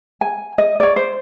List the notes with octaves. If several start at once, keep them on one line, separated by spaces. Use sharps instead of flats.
G#5
D#5
C#5 D5
C5